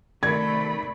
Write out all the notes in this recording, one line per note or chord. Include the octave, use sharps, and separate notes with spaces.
C3 D#3 A3 D5 B5 G#6